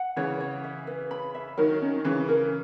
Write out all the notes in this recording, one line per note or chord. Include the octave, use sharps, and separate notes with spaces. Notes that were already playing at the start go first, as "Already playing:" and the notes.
Already playing: F#5
C#3 E3 C#5
C#5
E5
B4
B5
E5
D#3 F#3 A#4
C#4
C#3 E3 C#4
A#4